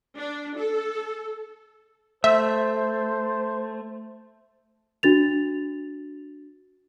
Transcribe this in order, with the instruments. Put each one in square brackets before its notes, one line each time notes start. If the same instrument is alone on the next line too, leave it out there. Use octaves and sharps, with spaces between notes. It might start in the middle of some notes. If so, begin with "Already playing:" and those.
[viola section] D4
A4
[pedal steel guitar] A3 [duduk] C5 [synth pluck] E5
[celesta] D4 F#4 A6 F7